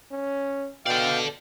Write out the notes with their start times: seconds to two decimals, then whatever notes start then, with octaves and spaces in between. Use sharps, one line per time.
0.11 C#4
0.86 B2 A4 D5 F5 G5 F6